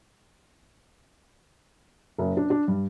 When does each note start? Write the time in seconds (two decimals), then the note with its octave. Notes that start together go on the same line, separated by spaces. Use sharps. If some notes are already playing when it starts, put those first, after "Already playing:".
2.18 F#1
2.37 D4
2.50 D4
2.68 G2